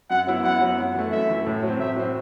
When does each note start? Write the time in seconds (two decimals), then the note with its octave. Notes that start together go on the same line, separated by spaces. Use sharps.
0.10 F#2 F#5
0.27 F#3 B3 E4
0.43 F#2 F#5
0.61 F#3 B3 E4
0.78 F#2
0.94 E3 A3
1.12 F#2 E5
1.29 E3 A3
1.46 A2
1.63 F#3 C4
1.79 A2 E5
1.96 F#3 C4